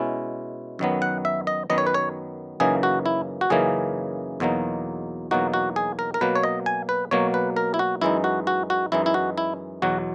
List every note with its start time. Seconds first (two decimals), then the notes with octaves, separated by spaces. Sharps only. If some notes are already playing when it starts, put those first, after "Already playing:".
Already playing: B2 G#3 C#4 E4
0.79 F#2 D#3 F#3 B3
1.02 F#5
1.25 E5
1.47 D#5
1.70 F#2 D#3 F#3 B3 D#5
1.78 C#5
1.87 B4
1.94 C#5
2.60 F#2 C#3 E3 A#3 D#4 G#4
2.83 F#4
3.06 E4
3.41 F#4
3.50 F#2 C#3 E3 A#3 D#4 G#4
4.40 E2 B2 F#3 A#3 D#4
5.31 E2 B2 F#3 A#3 D#4 F#4
5.54 F#4
5.76 G#4
5.99 A#4
6.14 A#4
6.21 B2 F#3 A#3 B4
6.35 C#5
6.43 D#5
6.66 G#5
6.89 B4
7.11 B2 F#3 A#3 C#5
7.34 B4
7.56 A#4
7.74 E4
7.79 F#4
8.01 F#2 E3 G#3 D#4 E4
8.24 F#4
8.47 F#4
8.70 F#4
8.92 F#2 E3 G#3 D#4 E4
9.06 E4
9.14 F#4
9.38 E4
9.82 E2 B2 F#3 F#4